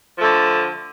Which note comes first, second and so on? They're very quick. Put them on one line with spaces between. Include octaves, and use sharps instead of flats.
F3 A3 D3